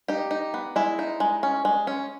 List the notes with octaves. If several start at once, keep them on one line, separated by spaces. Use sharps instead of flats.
D#4 G4
D#4
B3
G#3 E4
D#4
G#3
C#4
G#3
C#4